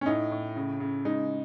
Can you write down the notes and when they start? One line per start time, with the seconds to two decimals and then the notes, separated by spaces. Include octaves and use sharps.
0.01 C#4
0.06 A2 D#4
0.31 A2
0.56 C#3
0.80 C#3
1.05 G#3 D#4